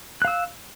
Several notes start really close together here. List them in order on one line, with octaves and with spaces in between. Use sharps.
F#6 F5 E6